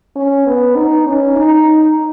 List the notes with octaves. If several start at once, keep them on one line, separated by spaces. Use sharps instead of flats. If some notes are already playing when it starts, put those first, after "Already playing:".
C#4
B3
D#4
C#4
D#4